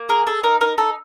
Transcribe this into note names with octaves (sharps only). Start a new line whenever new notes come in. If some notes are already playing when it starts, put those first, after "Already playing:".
Already playing: A#3
G#4 A#4
G#4 A4
D#4 A#4
D#4 A#4
D#4 A4